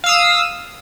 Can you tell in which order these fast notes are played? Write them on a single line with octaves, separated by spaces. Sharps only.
F5 E6 D#6